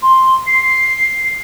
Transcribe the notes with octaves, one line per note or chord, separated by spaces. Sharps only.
C6
C7